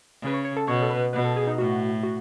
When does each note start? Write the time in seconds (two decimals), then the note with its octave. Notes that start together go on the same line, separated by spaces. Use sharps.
0.22 C#3 B4
0.34 C#5
0.45 C#5
0.57 A4
0.67 B2 C#5
0.82 A4
0.90 B4
1.13 B2 B4
1.24 A4
1.36 G#4
1.47 D#4
1.58 A2 F#4
2.03 F#4